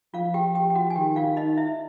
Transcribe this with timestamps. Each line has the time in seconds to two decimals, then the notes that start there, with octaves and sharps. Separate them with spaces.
0.14 F3 F4 F5
0.34 G4 G5
0.55 G4 G5
0.70 G5
0.75 F#4 F#5
0.90 G#5
0.96 D#3 G4 G5
1.16 F4 F5
1.37 D#4 D#5
1.57 E4 E5